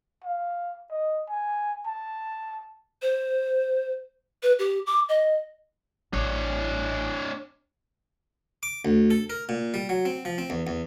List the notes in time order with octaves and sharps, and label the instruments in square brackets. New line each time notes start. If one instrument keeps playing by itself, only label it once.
[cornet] F5
D#5
G#5
A5
[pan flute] C5
B4
G4
D6
D#5
[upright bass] A1 [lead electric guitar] D4 C#5
[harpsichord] D6
D2
A4
A#4
A#2
G3
F#3
C4
F3
C4
E2
E2